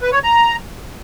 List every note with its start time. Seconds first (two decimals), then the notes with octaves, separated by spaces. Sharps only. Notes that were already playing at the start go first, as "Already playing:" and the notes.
0.01 B4
0.12 C#5
0.23 A#5